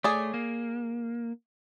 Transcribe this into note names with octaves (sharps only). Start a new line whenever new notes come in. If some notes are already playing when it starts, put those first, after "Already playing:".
A3 G#4 C#5 D5
A#3